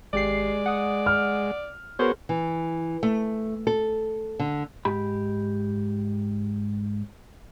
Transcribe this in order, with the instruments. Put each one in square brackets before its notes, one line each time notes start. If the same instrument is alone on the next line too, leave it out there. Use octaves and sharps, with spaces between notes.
[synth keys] G#1 G4 C7 [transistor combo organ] G#3 [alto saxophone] D5
[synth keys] F#5 D#6
[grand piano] F6
[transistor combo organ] B3 F#4 C#5 [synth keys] G#4 A#4 [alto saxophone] C5
[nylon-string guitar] E3
A3
A4
D3
[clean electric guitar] G#2 G4 B5